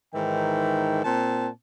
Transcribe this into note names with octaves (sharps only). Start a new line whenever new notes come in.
G#2 D#3 E3 G5
A#2 C4 A5